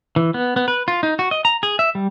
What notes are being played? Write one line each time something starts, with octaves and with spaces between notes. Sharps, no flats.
E3
B3
B3
B4
F4
D#4
F#4
D#5
A#5
G#4
E5
G3